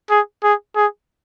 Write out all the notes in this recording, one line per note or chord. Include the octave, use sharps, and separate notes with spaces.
G#4
G#4
G#4